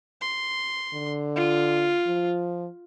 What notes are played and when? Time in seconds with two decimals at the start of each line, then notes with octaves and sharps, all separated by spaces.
0.22 C6
0.94 D3
1.36 F4
2.07 F3